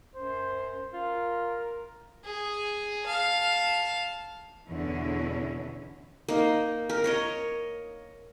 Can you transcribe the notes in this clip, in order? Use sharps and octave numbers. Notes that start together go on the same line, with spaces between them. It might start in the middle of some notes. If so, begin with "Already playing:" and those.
F#2 C5
F4 A#4
G#4
F5 A5
E2 B2 D3 C#4 E4
A#3 D#4
A#4
A#4 C#5 D#5